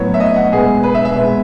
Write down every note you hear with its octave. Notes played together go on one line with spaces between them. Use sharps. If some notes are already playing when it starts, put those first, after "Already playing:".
Already playing: A2 F#3 B3 C#5
E5
D#5
F#5
B2 G#3 B3 G#4
B4
E5
E5
B2 G#3 B3